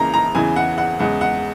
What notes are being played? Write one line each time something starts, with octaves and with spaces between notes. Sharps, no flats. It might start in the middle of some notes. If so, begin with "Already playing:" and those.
Already playing: C#2 C#3 E3 A#3 A#5
A#5
E2 C#3 E3 G#5
F#5
F#5
E2 C#3 G#3 F#5
F#5